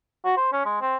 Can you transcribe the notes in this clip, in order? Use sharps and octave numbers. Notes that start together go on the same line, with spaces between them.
F#4
C5
C#4
G#3
C4